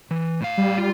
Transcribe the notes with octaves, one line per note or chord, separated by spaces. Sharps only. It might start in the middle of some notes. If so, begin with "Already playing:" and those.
E3
A2 F5
G3
F4